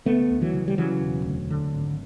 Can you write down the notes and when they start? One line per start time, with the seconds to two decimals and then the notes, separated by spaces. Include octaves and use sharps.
0.06 D2 A3 B3
0.30 D2
0.42 E3 F#3
0.53 C#3
0.68 G3
0.78 C#3 E3 F#3
1.01 E1
1.26 D2
1.50 D3
1.74 G#1